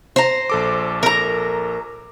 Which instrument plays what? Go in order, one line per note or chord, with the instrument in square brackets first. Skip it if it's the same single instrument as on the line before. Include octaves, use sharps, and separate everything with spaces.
[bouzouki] C5 A#5
[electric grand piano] A#1 A4 D6
[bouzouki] A#4 A#5